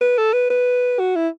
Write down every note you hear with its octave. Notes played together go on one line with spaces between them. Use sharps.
B4
A4
B4
B4
F#4
E4